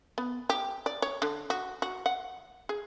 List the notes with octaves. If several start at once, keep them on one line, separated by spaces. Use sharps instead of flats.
B3
G4
D5
C#5
D3
F#4
F#4
F#5
G#4